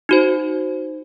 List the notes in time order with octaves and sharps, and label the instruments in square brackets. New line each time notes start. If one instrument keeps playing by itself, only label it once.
[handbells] D#4 F#4 C5